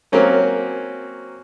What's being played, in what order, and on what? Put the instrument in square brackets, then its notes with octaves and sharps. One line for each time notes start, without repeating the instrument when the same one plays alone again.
[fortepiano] F#3 A#3 C4 C#4 A#4